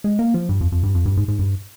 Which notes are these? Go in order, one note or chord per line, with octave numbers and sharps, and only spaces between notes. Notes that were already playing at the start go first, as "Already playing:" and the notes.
G#3
A#3
F3
G2
F2
F2
G2
F2
G2
G#2
G#2
G2